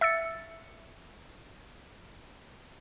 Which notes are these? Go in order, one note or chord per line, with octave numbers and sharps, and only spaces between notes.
E5 E6 A6 C#7